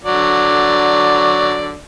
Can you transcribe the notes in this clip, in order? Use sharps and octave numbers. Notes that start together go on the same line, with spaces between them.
D3 F#3 D5